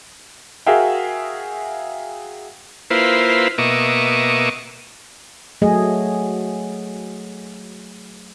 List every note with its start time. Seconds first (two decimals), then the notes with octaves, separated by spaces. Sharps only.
0.66 F#4 G#4 A#4 E5 F5 G5
2.90 A#3 E4 F4 B4 C5
3.58 B2 A#3 D#5 E5 C#6 D6
5.62 F#3 A3 G#4 D#5